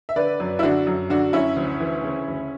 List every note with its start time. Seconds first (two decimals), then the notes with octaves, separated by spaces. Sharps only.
0.09 E5
0.16 D3 B4 D5
0.40 F#2
0.59 E4
0.63 D3 D4 F#4
0.87 F#2
1.10 D3 D4 F#4
1.33 F#2 C#4 E4
1.56 D2
1.80 E3
2.03 C#3
2.28 D2